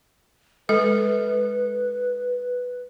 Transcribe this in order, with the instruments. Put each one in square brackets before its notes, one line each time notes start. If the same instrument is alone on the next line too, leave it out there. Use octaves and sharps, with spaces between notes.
[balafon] G#3 A4 [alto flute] B4